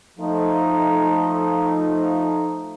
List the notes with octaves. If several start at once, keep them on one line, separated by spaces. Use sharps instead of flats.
F3 A3 D#4